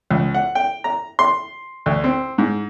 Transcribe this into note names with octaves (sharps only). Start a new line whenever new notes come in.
C#2
F#5
G5
A#5
C6
D2
C4
G#2